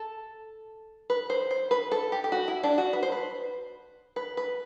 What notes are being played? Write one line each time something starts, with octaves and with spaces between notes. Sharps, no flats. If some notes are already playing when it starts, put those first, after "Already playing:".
Already playing: A4
B4
C5
C5
B4
A4
G4
G4
F#4
E4
D4
F#4
B4
C5
B4
B4
B4